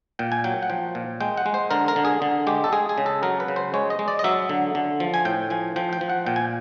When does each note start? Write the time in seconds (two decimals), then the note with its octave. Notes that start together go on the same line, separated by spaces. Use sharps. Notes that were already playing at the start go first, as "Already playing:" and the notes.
0.19 A#2 G5
0.32 G#5
0.44 F#3 G5
0.63 F#5
0.70 F3 G5
0.95 A#2
1.20 G#3 G5
1.37 F#5
1.46 G#3
1.54 C5
1.71 D3 A#4
1.88 A#4
1.96 D3
2.05 G#4
2.22 D3
2.47 G#3 G4
2.64 A4
2.72 G#3 G#4
2.89 G#4
2.98 C#3
3.06 A4
3.23 F#3 A#4
3.40 B4
3.48 C#3
3.56 C5
3.74 G#3 C#5
3.90 D#5
3.99 G#3
4.08 D5
4.19 D#5
4.24 F#3 E5
4.49 D3
4.75 D3
5.00 F3
5.14 G#5
5.25 A2 G5
5.50 F3 G#5
5.76 F3 G5
5.93 G5
6.01 F3
6.09 F#5
6.26 A#2 G5
6.36 G#5